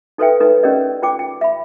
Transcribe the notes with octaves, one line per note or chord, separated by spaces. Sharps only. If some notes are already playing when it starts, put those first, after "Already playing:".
D#4 A4 B4 C5 E5 G5
D#4 A4 B4 C#5
C#4 G4 A#4 D5 D#5
F4 C5 G5 D6
G5
E5 B5